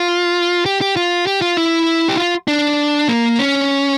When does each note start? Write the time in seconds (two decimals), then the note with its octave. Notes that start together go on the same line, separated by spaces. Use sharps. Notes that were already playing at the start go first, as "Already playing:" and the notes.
Already playing: F4
0.66 G4
0.81 G4
0.96 F4
1.27 G4
1.42 F4
1.57 E4
2.08 G4
2.17 F4
2.48 D4
3.09 A#3
3.39 C#4